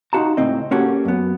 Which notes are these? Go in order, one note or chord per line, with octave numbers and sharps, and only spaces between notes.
D#4 F4 F#4 A5 A#5
C#2 A2 C4 D#5
A#3 C#4 F#4 G4 A4
F#2 B3